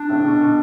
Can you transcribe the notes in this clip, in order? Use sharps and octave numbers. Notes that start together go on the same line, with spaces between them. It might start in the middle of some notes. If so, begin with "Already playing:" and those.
Already playing: D4
A2 C#3
B2 D3
B2 D3